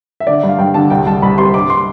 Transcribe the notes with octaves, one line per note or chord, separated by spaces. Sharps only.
E5
D3 D5
G2
F5
G2 G5
D3 A5
C2 G5
C2 A5
C2 B5
C3 C6
G2 D6
C6